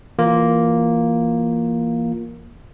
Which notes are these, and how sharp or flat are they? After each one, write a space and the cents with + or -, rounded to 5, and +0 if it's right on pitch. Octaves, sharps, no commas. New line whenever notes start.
E3 +15 A#3 +0 F4 +0